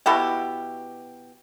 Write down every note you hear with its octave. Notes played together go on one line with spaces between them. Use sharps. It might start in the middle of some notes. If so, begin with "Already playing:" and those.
B2 E4 F#4 G4